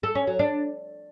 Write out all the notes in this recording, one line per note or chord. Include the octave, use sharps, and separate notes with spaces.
A4
C#4
F#3
D4